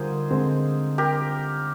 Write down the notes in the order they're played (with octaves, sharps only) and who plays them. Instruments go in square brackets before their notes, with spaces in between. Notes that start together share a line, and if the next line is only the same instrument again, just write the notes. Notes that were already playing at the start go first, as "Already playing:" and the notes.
Already playing: [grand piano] D3 G3 [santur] D#4 F4 G#4 A#4 C5
[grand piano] D3 G#3 C4
[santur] G4 A#4